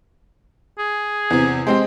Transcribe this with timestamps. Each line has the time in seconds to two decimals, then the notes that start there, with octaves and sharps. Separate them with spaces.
0.79 G#4
1.30 E2 C3
1.67 G#3 C4 G4 C5